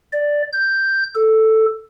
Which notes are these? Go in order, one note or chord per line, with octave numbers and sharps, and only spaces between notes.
D5
G6
A4